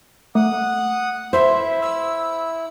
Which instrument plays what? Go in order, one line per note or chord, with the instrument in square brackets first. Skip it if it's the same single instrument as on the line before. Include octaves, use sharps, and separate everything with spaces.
[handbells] A3 [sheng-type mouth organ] F#5 D#6
[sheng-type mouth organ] E4 [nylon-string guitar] C5 [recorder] E5
[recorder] E6